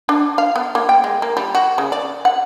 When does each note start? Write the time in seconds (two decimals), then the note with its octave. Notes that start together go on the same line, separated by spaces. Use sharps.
0.09 D4
0.38 F5
0.56 B3
0.75 A#3
0.89 G5
1.04 G#3
1.22 A#3
1.37 G3
1.55 F#4
1.78 C#3
1.92 D5
2.25 F#5